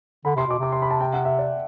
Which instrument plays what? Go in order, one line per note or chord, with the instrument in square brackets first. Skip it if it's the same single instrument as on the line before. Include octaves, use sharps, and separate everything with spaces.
[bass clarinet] D3 [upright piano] B5
[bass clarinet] C3 [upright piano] C6
[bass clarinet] B2 [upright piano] D6
[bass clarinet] C3 [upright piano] D6
[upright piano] C6
B5
A5
G5
F#5
E5
D5